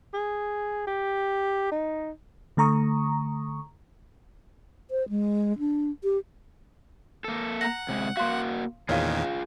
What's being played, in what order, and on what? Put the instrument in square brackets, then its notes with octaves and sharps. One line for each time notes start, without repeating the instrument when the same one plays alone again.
[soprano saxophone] G#4
G4
D#4
[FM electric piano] D3 A3 A#5 C#6 D#6
[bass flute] C5
G#3
D4
G4
[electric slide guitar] A#3 A4
[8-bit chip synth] F#5 [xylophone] A#5 A#6
[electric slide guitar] C3 G#3
[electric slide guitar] A#3 F#4 [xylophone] F5 C6
[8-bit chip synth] E2 A#2 D#3 [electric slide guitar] F4 G#4 [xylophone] C#5 F5